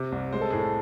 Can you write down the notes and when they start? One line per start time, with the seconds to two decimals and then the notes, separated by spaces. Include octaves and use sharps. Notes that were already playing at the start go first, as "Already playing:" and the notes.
Already playing: C3
0.12 C2
0.33 G#3 C5
0.41 A4
0.50 A2 G#4
0.59 A4